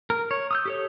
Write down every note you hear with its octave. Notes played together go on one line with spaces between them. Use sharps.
A#4
C#5
D#6 E6 G6
G4 A4 C#5